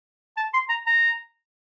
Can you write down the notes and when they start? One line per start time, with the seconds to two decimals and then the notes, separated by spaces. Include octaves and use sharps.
0.37 A5
0.54 C6
0.69 A#5
0.87 A#5